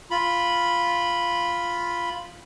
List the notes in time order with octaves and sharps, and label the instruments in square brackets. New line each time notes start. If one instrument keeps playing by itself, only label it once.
[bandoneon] F4 B5